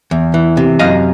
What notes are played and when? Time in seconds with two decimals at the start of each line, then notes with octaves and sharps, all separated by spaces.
0.11 E2
0.34 E3
0.57 C3
0.79 F#2 D#5 F5